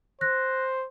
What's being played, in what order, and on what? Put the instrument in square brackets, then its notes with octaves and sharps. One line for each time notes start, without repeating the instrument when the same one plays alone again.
[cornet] C5 [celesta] F#6 A#6